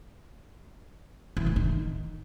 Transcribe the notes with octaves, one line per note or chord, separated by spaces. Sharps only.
E3
A2
D#3